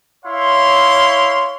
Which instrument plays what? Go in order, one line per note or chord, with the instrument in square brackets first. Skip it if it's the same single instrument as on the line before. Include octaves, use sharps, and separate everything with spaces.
[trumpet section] E4 C#5 F5 C6